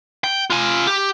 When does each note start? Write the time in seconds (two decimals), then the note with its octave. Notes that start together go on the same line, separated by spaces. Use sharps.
0.24 G5
0.50 F4 G#5
0.87 G4